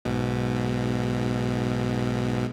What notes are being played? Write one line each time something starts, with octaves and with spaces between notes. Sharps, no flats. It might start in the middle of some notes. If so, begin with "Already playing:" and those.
B1 G#2 B2